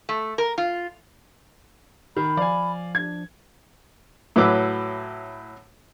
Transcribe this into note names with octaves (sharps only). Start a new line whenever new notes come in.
A3
A#4
F4
D#3 B5
F3 D5 F5 G#5
D4 G#6
A2 F#3 B4 D6 E6